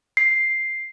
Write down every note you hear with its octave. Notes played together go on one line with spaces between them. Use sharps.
C7